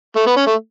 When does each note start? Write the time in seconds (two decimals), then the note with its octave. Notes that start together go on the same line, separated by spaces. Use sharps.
0.16 A3
0.26 B3
0.37 C#4
0.47 A3